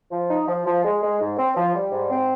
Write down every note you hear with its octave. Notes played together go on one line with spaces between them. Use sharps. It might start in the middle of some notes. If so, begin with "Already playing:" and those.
F3
D#4
F3
F3
G#3
G#3
G#2
C4
F3
G3
G#2
C4